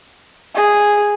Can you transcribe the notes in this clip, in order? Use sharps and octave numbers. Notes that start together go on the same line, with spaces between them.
G#4